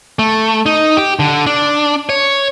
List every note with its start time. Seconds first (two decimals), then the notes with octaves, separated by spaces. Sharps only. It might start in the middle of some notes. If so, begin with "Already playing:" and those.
0.19 A3
0.66 D#4
0.97 G4
1.19 D3
1.46 D4
2.09 C#5